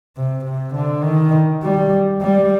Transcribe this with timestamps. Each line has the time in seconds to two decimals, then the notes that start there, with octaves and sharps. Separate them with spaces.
0.16 C3
0.45 C3
0.75 D3
1.04 D#3
1.63 G3
2.21 G3